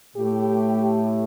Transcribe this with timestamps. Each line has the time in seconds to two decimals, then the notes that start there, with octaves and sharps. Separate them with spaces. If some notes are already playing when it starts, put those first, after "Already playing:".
0.16 A2 A3 G4